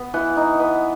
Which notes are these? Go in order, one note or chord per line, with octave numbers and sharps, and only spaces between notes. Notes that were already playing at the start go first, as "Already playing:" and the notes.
Already playing: B3
E3 F#5
D#4
B3